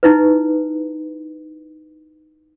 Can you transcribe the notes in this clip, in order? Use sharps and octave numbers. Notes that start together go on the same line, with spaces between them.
D#4 E4 B4